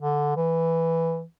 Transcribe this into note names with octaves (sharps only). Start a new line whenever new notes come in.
D3
E3